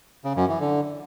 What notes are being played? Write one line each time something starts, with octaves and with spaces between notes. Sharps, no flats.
C#3
F#2
E3
D3